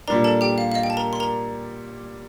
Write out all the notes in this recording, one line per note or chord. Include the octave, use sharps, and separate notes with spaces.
A#2 G3 D4 A#4 A#5
A4 A5
G4 G5
F5
F5
D#5
G5
A5
A#4 A#5
C6
A#4 A#5